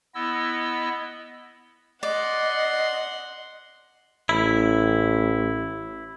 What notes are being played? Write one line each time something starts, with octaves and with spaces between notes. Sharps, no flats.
B3 E4 D#5 E6
D5 D#5 F#5 C6
A1 E4